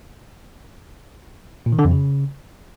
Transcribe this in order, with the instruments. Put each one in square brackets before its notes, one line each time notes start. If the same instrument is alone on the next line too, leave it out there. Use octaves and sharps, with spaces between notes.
[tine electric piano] A#2
D#3
D3
F2
C#3